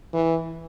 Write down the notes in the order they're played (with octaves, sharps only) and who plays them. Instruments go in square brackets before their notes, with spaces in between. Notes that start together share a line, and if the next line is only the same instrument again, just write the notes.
[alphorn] E3